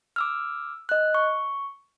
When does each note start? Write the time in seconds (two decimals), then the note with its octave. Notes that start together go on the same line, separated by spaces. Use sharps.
0.16 D6 E6 F6
0.89 D#5 F#6
1.14 C#6